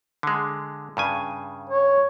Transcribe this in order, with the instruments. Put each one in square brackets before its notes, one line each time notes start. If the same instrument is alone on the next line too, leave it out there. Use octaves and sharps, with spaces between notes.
[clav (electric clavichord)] D3 G#3
G2 C#3 G#5
[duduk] C#5